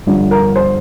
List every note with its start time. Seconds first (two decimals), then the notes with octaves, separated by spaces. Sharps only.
0.07 G1 G2 D3 F3
0.31 A#4
0.56 C5